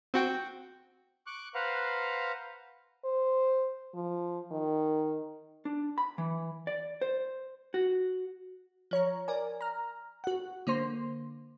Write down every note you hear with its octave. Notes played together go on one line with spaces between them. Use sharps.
C4 F#4 G5
C#6 D6 F#6
B4 C5 F5 F#5 A#5
C5
F3
D#3
D4
B5
E3
D5
C5
F#4
F3 C#5 A#5
A#4 D5 G#5
A#5 F6
F#4 F#5
D3 A#3 C5 C6